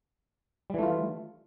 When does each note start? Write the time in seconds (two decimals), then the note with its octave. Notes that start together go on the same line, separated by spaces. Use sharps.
0.70 G3
0.74 E3
0.79 A3
0.83 F4